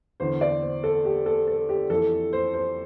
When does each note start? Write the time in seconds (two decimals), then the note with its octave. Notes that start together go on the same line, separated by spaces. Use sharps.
0.20 E2 D3 C5
0.41 D5
0.63 C5
0.83 A4
1.05 G4
1.26 A4
1.47 A4
1.69 G4
1.90 F2 E3 A4
2.33 C5
2.54 C5